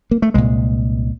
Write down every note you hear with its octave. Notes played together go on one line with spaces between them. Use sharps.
A#3
A3
C2 A#2 G#3